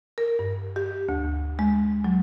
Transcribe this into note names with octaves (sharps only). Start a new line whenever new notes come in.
A#4
G2
G4
D2
G#3
F#3